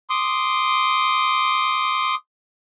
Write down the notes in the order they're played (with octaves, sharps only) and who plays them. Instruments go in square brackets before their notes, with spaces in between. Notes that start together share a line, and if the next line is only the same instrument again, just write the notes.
[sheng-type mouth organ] C6 D6 D#6